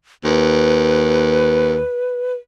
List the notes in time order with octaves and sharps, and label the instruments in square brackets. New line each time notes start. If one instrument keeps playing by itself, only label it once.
[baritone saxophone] D#2 [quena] B4